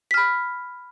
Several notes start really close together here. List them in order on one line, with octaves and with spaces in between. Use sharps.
B6 F6 B5